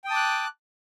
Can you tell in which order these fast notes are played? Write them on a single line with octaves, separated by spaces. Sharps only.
G5 D#6 A5 D6 F#6